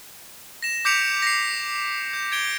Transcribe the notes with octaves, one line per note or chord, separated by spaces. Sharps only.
A#6 E7
D6 G6 B6 C#7 D7 F7
A#6 C7
G6
G#6 D7 G7